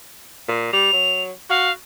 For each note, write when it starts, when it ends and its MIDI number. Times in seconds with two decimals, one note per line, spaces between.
0.48 0.72 46
0.73 0.91 55
0.73 1.22 101
0.93 1.31 54
1.50 1.70 66
1.50 1.72 77